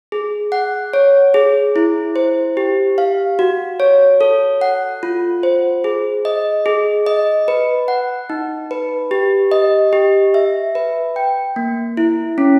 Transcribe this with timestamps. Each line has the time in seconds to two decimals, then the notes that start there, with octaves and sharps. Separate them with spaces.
0.12 G#4
0.52 F#5
0.93 C#5
1.34 G#4
1.76 E4
2.16 C5
2.57 G4
2.98 F5
3.39 F#4
3.80 C#5
4.21 A4
4.61 F#5
5.03 F4
5.43 C5
5.84 G#4
6.25 D#5
6.66 G#4
7.06 D#5
7.48 B4
7.88 F#5
8.30 D#4
8.71 B4
9.11 G4
9.51 D#5
9.93 G4
10.34 E5
10.75 B4
11.16 G5
11.56 A#3
11.97 E4
12.38 C#4